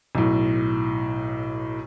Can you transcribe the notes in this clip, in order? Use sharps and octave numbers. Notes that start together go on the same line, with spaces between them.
B1 A2